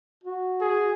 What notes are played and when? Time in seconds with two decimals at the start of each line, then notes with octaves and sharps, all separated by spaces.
0.23 F#4
0.61 G#4